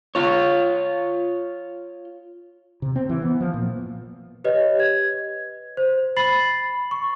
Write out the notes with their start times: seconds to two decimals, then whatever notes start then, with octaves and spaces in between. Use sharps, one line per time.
0.15 F4 C#5
2.82 C3
2.96 C4
3.09 E3
3.22 B3
3.40 F3
3.54 A#2
4.44 G4 B4 C#5 D#5
4.80 G#6
5.77 C5
6.17 B5 A6 C7 F#7
6.91 C#6